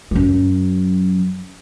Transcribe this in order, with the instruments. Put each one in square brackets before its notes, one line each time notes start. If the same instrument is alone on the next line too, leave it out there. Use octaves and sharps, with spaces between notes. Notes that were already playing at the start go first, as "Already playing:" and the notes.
[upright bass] F#2 F#3